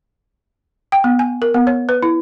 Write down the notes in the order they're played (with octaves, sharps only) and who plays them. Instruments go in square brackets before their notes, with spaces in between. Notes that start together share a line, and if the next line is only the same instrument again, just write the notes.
[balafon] G5
B3
G#5
A#4
B3
C#5
B4
E4